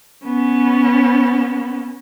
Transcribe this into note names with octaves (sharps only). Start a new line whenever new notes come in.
B3 C#4